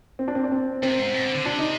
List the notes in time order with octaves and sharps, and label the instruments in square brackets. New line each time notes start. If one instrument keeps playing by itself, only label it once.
[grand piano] C4
D4
C4
D4
C4
[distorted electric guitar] C3 [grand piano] C4
[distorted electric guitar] G#2
B2
D3
D3
[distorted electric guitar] C3 [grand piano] D4
[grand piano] D#4